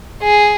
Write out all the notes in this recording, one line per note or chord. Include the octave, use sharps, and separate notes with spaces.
G#4